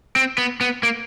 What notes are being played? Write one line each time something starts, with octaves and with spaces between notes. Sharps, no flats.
C4
B3
B3
A#3